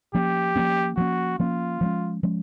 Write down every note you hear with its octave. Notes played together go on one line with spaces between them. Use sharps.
F3 A#3 C#4 G4
F3 A#3 C#4
F3 A#3 C#4 F#4
F3 A#3 C#4 F4
F3 G#3 C#4
F3 G#3 C#4